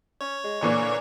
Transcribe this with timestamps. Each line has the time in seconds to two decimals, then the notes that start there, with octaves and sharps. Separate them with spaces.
0.21 C#4 C#5
0.44 G#3
0.61 A#2 D3 E3 C#6